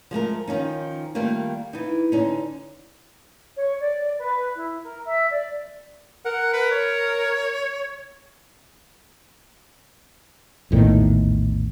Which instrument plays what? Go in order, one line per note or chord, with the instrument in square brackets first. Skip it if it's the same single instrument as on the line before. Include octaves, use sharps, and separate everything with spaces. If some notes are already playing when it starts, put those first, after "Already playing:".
[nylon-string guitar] F3 G#3 A3 A#4
D#3 F3 C#4 D#4
D#3 G3 A3 A#3 F4
E3 D#4
D3 C#4 D#4
[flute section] C#5
D5
B4
E4
A#4
E5
D5
[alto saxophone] A#4 [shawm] F#5
[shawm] B4
C#5
[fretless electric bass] A#1 E2 A2 D#3